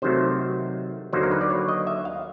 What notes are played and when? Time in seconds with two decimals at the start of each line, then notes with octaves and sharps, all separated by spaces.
0.02 C3 D#3 F#3 A3 C5
1.13 D#2 D3 F#3 A#3 D#4 C5
1.23 A#4
1.31 B4
1.41 D5
1.50 C#5
1.68 D#5
1.87 E5
2.05 F5